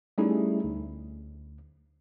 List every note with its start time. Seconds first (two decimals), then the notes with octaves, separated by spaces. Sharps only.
0.18 G3 A3 C#4 D#4 E4 G#4
0.64 D2